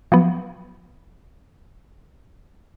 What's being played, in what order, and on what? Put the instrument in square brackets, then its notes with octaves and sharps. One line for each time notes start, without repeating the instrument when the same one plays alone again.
[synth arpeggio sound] F3 F#3 B3